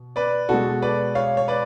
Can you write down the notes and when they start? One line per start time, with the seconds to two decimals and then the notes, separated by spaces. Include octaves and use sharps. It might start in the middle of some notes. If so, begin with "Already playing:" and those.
Already playing: B2
0.16 B4 D5
0.49 B2 G#3 F#4 A4
0.82 B4 D5
1.15 C#5 F5
1.37 C#5
1.48 B4 D5